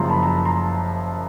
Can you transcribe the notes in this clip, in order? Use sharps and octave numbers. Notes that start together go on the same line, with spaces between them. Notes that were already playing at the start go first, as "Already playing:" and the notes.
Already playing: F#1 F#2 C#3 F3 A#5 C6
A5 B5
A#5
A5 B5
A#5 C6